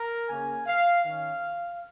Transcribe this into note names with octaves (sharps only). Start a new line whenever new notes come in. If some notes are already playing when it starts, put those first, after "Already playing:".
Already playing: A#4
C#3 A#3 C#4 G#5
F5
D#3 C#4 F5